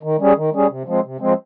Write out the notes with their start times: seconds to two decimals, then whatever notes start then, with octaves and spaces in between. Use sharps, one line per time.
0.03 D#3
0.19 G3 C#4 G#4
0.37 D#3
0.53 G3 C#4 G#4
0.69 C3
0.87 F3 G#3 C4
1.04 C3
1.20 F3 G#3 C4